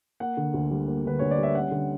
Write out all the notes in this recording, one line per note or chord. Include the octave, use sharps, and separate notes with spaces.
A#3 F#5
D3
D2
G3
A#3
D3 B4
D2 C#5
D5
G3
E5
C#4 F#5
D3